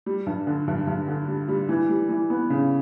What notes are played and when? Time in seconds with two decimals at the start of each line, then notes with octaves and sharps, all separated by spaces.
0.06 G3
0.26 G2
0.47 D3
0.68 G2
0.87 G2
1.08 D3
1.28 G3
1.48 G3
1.69 E3
1.89 G3
2.09 E3
2.30 B3
2.50 C#3